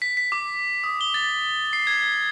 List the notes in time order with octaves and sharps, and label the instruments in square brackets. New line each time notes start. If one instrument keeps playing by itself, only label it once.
[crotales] B6
B6
D6
D#6
G7
A6
C7
G#6